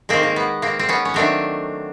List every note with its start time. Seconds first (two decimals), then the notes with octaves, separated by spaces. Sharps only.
0.09 D#3 G#3 A#3 C4
0.23 A#3
0.36 B3
0.62 A#3 C4
0.79 C4
0.89 B3 C#4
1.05 C#4
1.14 D#3 F#3 A3 C4 D4